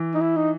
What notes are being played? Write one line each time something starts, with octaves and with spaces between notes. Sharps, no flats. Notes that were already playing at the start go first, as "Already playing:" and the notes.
Already playing: E3
D#4
E4
D#4